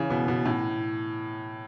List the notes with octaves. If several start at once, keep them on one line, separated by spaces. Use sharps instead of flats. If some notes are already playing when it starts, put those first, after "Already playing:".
Already playing: C#3 E3
B2
B2
A2